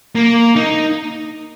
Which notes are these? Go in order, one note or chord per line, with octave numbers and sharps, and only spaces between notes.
A#3
D#4